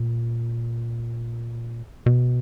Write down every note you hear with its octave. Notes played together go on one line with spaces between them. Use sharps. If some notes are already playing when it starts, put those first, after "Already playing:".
Already playing: A#2
B2